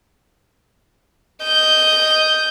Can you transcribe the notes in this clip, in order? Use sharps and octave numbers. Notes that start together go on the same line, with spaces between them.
D#5 G6